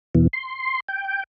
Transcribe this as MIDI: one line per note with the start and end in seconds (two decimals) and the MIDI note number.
0.15 0.27 40
0.15 0.27 47
0.15 0.27 52
0.33 0.80 84
0.88 1.23 79